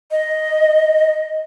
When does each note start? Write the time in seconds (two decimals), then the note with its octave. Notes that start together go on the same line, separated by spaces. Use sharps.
0.11 D#5